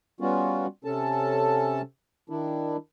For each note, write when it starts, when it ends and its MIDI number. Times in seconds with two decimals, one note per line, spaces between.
0.21 0.67 55
0.21 0.67 59
0.21 0.67 61
0.21 0.67 65
0.21 0.67 66
0.85 1.82 48
0.85 1.82 61
0.85 1.82 69
0.85 1.82 81
2.30 2.77 51
2.30 2.77 62
2.30 2.77 64